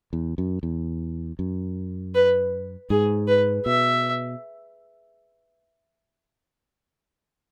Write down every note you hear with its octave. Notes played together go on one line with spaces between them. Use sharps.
E2
F#2
E2
F#2
B4
G#2 G#4
B4
B2 E5